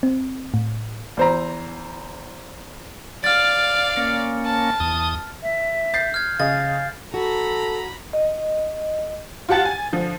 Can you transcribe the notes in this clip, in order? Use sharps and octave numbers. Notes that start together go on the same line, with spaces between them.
C4
A2
E2 C5 A#5
D5 F5 F6 A6
A#3 C#4
A5
E2 D#6
E5
G6 A6 C7
F6 G#6
C#3 D#5 F5 A6
F#4 A4 A#5 B5
D#5
F4 G4 F#5 A5 A6
G#5
D3 F3